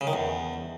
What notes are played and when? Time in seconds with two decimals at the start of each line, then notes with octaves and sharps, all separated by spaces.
0.01 C#3
0.07 D#3
0.13 E2